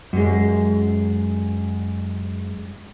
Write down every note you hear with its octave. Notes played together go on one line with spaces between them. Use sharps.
F#2 G#3